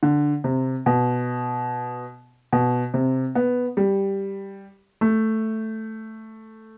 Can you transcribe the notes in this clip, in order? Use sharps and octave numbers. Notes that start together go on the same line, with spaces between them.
D3
C3
B2
B2
C3
B3
G3
A3